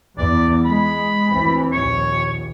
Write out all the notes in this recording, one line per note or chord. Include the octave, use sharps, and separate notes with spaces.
E2 D5
G#3 B5
D2 E3 C4
A#1 D#2 C#5